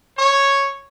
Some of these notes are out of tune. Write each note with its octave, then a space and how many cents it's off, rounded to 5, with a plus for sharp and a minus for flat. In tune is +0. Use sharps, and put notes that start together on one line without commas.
C#5 -5